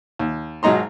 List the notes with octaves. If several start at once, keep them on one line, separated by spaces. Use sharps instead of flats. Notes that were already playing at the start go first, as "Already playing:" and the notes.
D#2
G#1 F#3 G#3 D#4 A#5 C6